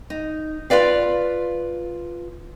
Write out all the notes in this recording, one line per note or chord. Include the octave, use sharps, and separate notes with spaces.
D#4
F4 G4 B4 D5 F5